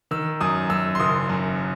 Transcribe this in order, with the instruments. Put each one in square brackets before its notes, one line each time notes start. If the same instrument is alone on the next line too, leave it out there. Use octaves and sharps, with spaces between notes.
[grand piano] D#3 E6
F#2 D#6
F#2 E6
C6
F#1 D#6
F#2